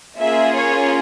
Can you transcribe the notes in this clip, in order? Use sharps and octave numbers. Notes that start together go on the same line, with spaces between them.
A#3 C#4 F4 G#4 E5
C#5